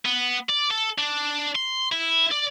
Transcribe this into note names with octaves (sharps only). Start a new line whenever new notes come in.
B3
D5
A4
D4
C6
E4
D5